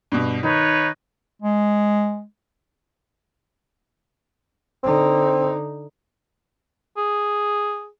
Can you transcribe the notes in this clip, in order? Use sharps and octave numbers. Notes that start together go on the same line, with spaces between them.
G2 B2
D#3 D#4 B4 C#5
G#3
D3 C4 D#4
G#4